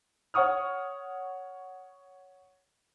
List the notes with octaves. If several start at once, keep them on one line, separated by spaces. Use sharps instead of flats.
C#5 F#5 C#6 D#6 F6